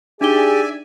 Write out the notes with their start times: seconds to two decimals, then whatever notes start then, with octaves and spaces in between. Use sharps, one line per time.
0.21 D4 D#4 G4 G#4 D5 E5 G#5 G7